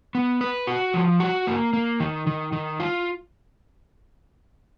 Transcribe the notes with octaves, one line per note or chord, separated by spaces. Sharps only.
B3
B4
F#4
F3
F#4
A#3
A#3
D#3
D#3
D#3
F4